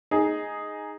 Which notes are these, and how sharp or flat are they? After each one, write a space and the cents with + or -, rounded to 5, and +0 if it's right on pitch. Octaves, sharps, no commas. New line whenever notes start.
D#4 +0 G#4 +0